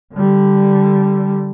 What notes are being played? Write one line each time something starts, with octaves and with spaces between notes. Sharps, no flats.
D3 G3